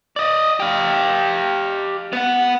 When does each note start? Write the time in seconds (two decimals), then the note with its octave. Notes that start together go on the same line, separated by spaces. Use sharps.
0.16 D5 D#5
0.60 G4 F5
2.13 B3 F#5